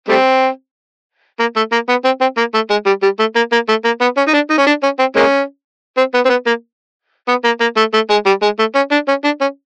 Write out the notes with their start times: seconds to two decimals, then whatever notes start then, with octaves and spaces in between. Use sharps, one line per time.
0.08 G3 A3 C4
1.39 A#3
1.56 A3
1.72 A#3
1.89 B3
2.05 C4
2.21 C4
2.37 A#3
2.54 A3
2.70 G#3
2.86 G3
3.03 G3
3.19 A3
3.35 A#3
3.52 A#3
3.68 A3
3.84 A#3
4.01 B3
4.17 C#4
4.28 D#4
4.34 D4
4.50 D#4
4.58 C#4
4.66 D4
4.83 C#4
4.99 C4
5.16 G#3 A#3 C#4
5.97 C4
6.14 B3
6.25 C4
6.29 B3
6.46 A#3
7.28 B3
7.44 A#3
7.60 A#3
7.77 A3
7.94 A3
8.10 G#3
8.26 G3
8.42 G#3
8.59 A3
8.75 C#4
8.92 D4
9.08 C#4
9.24 D4
9.41 C#4